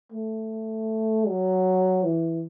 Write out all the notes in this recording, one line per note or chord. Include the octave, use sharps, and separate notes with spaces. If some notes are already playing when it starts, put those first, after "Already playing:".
A3
F#3
E3